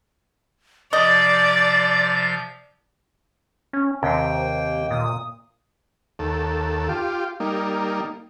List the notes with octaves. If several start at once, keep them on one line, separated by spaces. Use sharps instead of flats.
C3 F3 D5 D#5 G6 A6
C#4
D#2 C3 A#3 G5
A#2 D#6
D#2 A4
F4 G4
G3 A#3 D#4